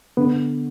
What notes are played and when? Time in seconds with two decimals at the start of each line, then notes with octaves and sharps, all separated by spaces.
0.17 D3 B3